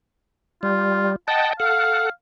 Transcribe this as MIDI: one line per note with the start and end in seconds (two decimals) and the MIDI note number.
0.63 1.16 55
0.63 1.10 65
1.28 1.53 75
1.28 1.53 78
1.28 1.53 79
1.28 1.51 81
1.60 2.09 69
1.60 2.08 77
1.60 2.09 78